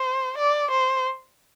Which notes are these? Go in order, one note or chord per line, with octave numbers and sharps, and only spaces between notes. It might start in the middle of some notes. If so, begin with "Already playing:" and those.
Already playing: C5
D5
C5